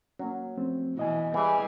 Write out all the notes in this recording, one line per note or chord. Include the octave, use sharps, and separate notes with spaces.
F#3 A#3 C#4
F3 A3 C4
B2 E3 E4 D#5 G#5
E3 G3 G#4 E5